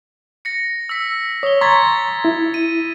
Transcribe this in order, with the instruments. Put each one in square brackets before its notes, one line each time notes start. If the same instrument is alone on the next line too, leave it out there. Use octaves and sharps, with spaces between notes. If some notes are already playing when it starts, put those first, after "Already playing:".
[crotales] A#6 C#7
E6 B6
[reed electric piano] C#5 [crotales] D#6 G7
[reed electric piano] A#5 C6 C#6 [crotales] G#6 A6 B6
[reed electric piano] E4
[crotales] D#7